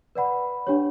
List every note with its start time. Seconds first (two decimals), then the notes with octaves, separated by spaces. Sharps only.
0.15 B4 D5 F#5 B5
0.67 D4 G4 C#5